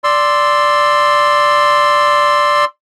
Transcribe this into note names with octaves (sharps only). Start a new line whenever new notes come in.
D5 C6 E6